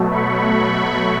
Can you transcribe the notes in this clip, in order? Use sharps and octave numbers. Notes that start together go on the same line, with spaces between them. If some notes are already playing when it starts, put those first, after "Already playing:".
Already playing: B2 F#3 A3
B5 C#6
B2 F#3 A3